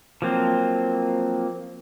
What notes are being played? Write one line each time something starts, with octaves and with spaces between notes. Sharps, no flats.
F3 F#3 A#3 C4